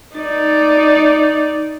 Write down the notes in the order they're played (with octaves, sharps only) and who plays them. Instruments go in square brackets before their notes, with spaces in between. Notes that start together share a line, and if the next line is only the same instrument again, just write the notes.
[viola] D#4 D5